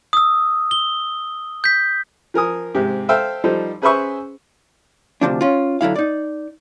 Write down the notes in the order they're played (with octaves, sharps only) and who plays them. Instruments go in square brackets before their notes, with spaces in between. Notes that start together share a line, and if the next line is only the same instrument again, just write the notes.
[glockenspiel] D#6 E6
G7
G6 B6
[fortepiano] F3 A#4 G#5 D#6
G#2 C3 G4
A4 C5 E5 F5 G5
F3 G3 D#4 A4 C5
C#4 G#4 B4 C5 E5 C#6
[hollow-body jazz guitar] D2 C3 F3 D4
C#4 F4
D3 F#3 E4 F5
D#4 D5